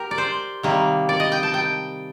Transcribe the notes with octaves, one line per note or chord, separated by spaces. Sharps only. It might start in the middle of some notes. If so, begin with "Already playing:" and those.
Already playing: G4 A#4
D5
C5
C3 D#3 G3 A#3
D5
D#5
G5
A5
G5